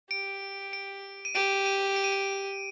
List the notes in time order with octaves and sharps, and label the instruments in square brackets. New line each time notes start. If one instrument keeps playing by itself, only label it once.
[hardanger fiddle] G4 [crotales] D7
[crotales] D7
D#7
[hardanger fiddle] G4 [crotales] D7
[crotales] D#7
D7
D#7
D7